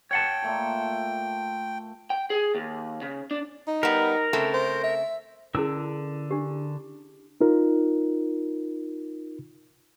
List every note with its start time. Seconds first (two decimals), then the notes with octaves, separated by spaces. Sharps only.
0.11 C#5 F#5 G5 A5
0.42 A#2 A3 A#5
2.10 G5
2.30 G#4
2.55 D#2
3.02 C#3
3.31 D4
3.68 D#4
3.83 G3 B3 A#4
4.33 C#3 A3 C4
4.54 C5
4.83 E5
5.55 D3 C#4 E4 G#4 A#4 E6
6.31 D4 G4
7.41 D#4 F4 A#4